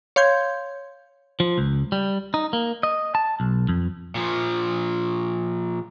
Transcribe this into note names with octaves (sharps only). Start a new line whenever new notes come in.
C#5 F5 C6 G6 G#6
F3
C#2
G3
D#4
A#3
D#5
A5
B1
F2
A#2 F3